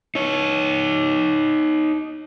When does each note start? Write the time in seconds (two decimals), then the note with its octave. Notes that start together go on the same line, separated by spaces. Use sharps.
0.15 D#4 C#5